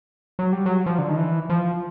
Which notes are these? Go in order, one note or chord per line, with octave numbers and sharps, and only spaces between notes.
F#3
G3
F#3
F3
D3
D#3
E3
F3